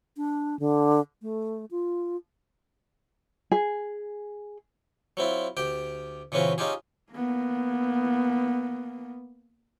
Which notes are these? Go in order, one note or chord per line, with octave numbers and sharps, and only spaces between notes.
D4
D3
A3
F4
G#4
F#3 C4 E4 F4
D2 G4 G5
A#2 C#3 E3 C4 C#4 F#4
C#4 D#4 F4 G4 G#4
A#3 B3